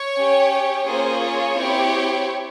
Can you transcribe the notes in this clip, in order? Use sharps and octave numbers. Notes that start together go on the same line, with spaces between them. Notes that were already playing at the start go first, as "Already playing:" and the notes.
Already playing: C#5
C#4 G4
A#3 C#4 F4 G#4 C5
C#5
C4 E4 G4